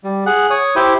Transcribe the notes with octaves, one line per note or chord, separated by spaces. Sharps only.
G3
G#4 F#5
C#5 D#6
E4 G4 C5